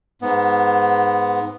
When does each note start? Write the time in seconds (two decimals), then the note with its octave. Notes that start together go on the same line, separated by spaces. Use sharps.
0.22 G#2 B3